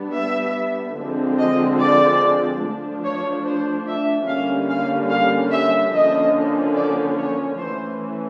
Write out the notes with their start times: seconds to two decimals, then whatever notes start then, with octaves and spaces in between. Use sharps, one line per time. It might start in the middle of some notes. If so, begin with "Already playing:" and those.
Already playing: G3 B3 D4
0.15 E5
0.98 D3 F3 G#3 C4
1.39 D#5
1.80 D5
2.62 F3 A3 D4
3.03 C#5
3.45 C5
3.87 E5
4.27 D3 G3 A#3 C#4 F5
4.69 F5
5.11 F5
5.51 E5
5.93 D3 F3 A#3 C#4 D#5
6.75 D5
7.16 C#5
7.58 E3 A3 C#4 C5